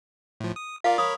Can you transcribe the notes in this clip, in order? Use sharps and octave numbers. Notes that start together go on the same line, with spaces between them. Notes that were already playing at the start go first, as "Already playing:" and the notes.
A2 F3
D#6
F4 A#4 D5 F5
A#4 C#5 B5 D#6